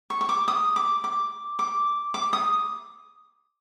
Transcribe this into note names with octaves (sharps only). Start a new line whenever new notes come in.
C#6
C#6
D6
D#6
D6
D6
D6
D6
D#6